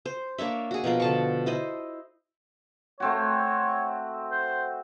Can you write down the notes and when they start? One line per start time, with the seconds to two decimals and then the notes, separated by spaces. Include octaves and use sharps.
0.05 C5
0.38 A#3 D4 C#5 E5
0.71 F#4 G#4
0.84 B2 F3 A#4 F5
1.00 D3 A5 C#6
1.46 E4 C5 D#5
3.00 A3 C4 F#4 C#5
4.31 C5